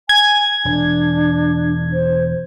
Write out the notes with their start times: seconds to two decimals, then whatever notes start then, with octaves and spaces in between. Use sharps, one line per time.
0.09 G#5 G#6
0.65 E1 D4
1.93 C5